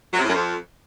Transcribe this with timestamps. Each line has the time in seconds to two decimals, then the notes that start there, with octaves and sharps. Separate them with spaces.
0.14 F#3
0.19 C3
0.24 A2
0.29 F#2
0.34 F2